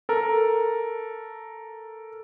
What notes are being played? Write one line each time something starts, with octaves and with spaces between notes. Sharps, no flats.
A4 A#4